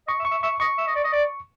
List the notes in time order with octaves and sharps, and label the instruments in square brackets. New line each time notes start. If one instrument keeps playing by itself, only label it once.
[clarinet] D#5 [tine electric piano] C#6
[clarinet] E5
[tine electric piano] C#6
[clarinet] E5
[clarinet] E5 [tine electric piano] C#6
[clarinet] D#5 [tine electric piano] C#6
[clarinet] E5
D#5
D5
D#5
D5